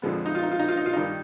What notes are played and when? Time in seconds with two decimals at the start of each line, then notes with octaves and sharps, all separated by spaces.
0.02 F2 D3 F3 G#3 B3
0.26 D#4
0.35 F4
0.43 D#4
0.51 F4
0.60 D#4
0.68 F4
0.77 D#4
0.86 F4
0.93 G2 D#3 G3 D#4